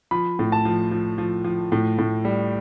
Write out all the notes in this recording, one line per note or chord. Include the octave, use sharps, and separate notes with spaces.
F3 B5
A2
A5
F3
F3
F3
F3
A2
A2
G3